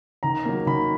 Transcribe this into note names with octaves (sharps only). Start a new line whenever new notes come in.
D#3 A#5
F#3 A#3
D#3 B5